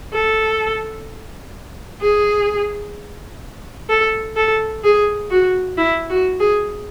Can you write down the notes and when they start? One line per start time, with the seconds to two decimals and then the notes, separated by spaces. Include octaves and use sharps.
0.13 A4
2.01 G#4
3.89 A4
4.36 A4
4.84 G#4
5.30 F#4
5.77 E4
6.09 F#4
6.40 G#4